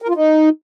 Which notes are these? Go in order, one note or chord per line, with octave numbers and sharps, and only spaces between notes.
A#4
F4
D#4